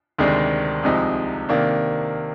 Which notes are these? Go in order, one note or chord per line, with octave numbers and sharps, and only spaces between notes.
D2 C3 D#3 G#3 D4
C2 C3 F3 G#3 D#4
C3 D#3 A#3 D4